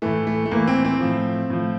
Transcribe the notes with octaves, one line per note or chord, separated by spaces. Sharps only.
A2 E3 A3
A3
A3
A2 E3 A#3
C4
C4
A2 F3
A2 F3